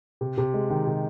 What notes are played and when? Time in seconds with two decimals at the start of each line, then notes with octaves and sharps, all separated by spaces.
0.21 C3
0.38 C3
0.54 G#3
0.70 D#3
0.87 C3